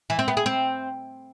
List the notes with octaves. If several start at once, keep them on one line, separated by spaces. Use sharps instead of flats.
E3
C4
B3
G#4
C4